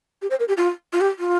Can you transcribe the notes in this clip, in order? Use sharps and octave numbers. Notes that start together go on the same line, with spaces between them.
G4
C5
A#4
G4
F4
F4
G4
F4